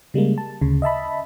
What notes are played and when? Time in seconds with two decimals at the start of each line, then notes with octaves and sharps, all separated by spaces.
0.14 C#3 G3 G#3 A#3
0.38 A5
0.61 D2 C#3
0.82 D#5 E5 A5 B5